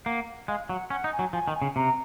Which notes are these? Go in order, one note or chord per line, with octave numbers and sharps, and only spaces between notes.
A#3 F#5
G#3 F5
F#3 F#5
C#4 F#5
D#4
G#5
F#3
F3 G#5
D#3
G#5
C#3
C3 A#5